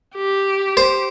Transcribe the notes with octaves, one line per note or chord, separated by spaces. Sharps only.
G4
C5